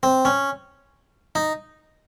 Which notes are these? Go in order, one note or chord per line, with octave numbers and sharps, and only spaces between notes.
C4
C#4
D#4